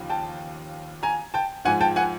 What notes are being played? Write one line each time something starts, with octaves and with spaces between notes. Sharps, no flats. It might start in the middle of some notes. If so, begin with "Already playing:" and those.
Already playing: D#2 C#3 F3
G5 A5
G#5 A#5
G5 A5
G#2 F3 F#5 G#5
G5 A5
F#5 G#5